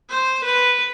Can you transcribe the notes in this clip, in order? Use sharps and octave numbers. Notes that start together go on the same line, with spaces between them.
C5
B4